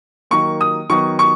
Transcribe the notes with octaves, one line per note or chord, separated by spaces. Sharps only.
D#3 F#3 A#3 C#6
D#6
D#3 F#3 B3 C#6
C#6